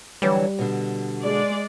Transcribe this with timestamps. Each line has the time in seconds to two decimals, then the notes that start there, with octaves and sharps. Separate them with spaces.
0.22 D3 E3 F#3 G3
0.59 B2 D3
1.23 G#3 D5